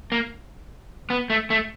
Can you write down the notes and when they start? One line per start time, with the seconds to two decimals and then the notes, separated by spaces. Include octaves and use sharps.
0.12 A#3
1.10 B3
1.30 A3
1.50 A3